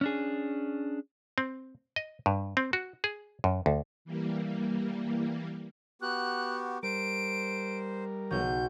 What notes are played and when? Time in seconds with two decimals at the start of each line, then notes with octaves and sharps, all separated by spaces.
0.01 C#4 D4 G#4
1.38 C4
1.96 D#5
2.26 G2
2.57 C4
2.73 F#4
3.04 G#4
3.44 F#2
3.66 D2
4.05 E3 G3 A#3
6.02 B3 F#4 G4 F#6
6.83 G3 A#4 C5 D7
8.31 B1 F#3 G6